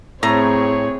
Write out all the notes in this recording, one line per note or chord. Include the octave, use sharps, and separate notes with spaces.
A2 C4 G#4 C#5 A#5